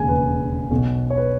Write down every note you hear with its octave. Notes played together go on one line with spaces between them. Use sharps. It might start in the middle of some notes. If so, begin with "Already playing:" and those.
Already playing: E1 D#2 C#3 G#5
B4
B1 B2
C#5
B4